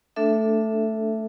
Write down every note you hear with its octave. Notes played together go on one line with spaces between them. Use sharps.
A3 D4 A4 E5